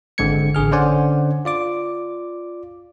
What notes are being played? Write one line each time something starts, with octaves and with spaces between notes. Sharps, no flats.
G#1 D3 G#3 C4 G#6 C#7
A1 D3 G#4 F6
D3 C#4 C5 D5 F#5 G#5
F4 D5 D6